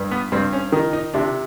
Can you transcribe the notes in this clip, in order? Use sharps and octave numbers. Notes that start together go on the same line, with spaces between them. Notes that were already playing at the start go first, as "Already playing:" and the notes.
Already playing: G2
B3
G2 C4
C#4
D#3 D#4
D#4
C3 D4